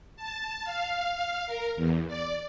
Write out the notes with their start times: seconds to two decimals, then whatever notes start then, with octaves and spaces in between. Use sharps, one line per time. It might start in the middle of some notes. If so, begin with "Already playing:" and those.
0.16 A5
0.64 F5
1.12 F5
1.46 A#4
1.76 E2
2.08 D5